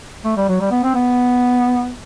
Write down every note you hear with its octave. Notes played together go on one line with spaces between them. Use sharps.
A3
G3
F#3
G3
B3
C4
B3